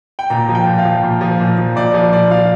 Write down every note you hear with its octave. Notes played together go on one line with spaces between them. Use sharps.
G5
A#2 A#5
F3
G5
A#2
F5
F3
A#2
F3
A#2
F3
A#2 D5
F3 D5
A#2 D5
F3 F5